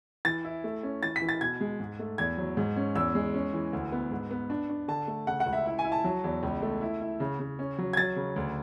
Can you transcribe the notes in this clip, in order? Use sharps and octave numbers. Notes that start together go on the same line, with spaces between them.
E3 A6
E4
A3
C#4
E3 A6
B6
E3
A6
B2 G#6
G#3
G#2
A3
E2 G#6
F#3
G#2
C#4
E2 E6
G#3
C#4
E3
D2
B3
G#2
B3
D4
D4
D3 A5
A3
C#3 F#5
F#5
C#2
E5
E4
G#5
E4
A5
F#3
E2
C#2
A3
E4
E4
C#3
C#3
C#4
F#3
G#6
F#3 A6
C#3
D2